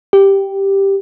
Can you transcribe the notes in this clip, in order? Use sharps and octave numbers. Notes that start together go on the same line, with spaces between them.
G4